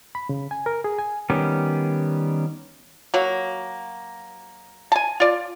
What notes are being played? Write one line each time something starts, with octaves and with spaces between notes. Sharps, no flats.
B5
C#3
G#5
A#4
G#4
G#5
D#3 G3 B3 C#4 G4
F#3 A#3
G#5 A5
F4 D5